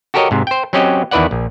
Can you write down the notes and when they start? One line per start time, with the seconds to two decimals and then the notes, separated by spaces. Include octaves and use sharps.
0.14 F#4 G4 A4 A#4 C#5 D#5
0.31 G#2 C3
0.47 C5 G5
0.73 F#3 C4 C#4 G4 D#5
1.11 E2 D#3 E4 B4 D5 F#5
1.31 A#1